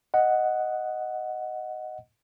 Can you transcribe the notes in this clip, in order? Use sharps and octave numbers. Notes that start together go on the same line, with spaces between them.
D#5 F#5